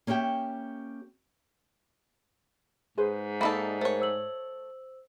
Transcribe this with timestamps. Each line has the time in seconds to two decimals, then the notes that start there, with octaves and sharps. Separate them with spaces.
0.07 A#3 C#4 G4 E5 G5
2.98 G#2 G#4 B4 C5
3.41 A#3 D#4 A4 D5 E5 B5
3.81 A3 A#4 C5 C#5
4.00 C5 E6 F#7